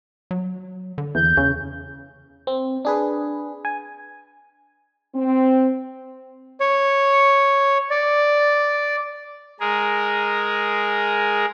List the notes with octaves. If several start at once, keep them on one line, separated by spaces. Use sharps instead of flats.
F#3
D3
E2 G6
E2 C#3
C4
D4 G#4 B4
G#5
C4
C#5
D5
G#3 G#4 A#4